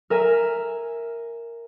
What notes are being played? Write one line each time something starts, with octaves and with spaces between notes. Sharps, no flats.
A#4 E5 G#5